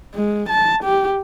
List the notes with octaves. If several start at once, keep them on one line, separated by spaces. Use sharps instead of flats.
G#3
A5
G4